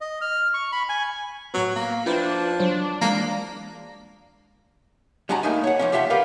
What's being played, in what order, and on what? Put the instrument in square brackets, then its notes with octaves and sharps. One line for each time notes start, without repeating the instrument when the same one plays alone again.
[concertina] D#5
F6
C#6
B5
G#5
[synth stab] A2 B3 [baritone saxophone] F#3
[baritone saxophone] A#3
[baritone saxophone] F3 [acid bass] D4 [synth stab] E4 B4 G5
[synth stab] F#3 C5 C#5 [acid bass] D4
[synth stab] E3 F#3 G#3 [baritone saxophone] A#3
[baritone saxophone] A#3
[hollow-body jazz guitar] G3 G#3 D4 F#4 G#5 A#5
A2 A3 A#3 D#4 G#5
C#5 F#5
E3 F3 C#4
G3 F4 G4 E5 F#5
G4 A#4 B4 F5 F#5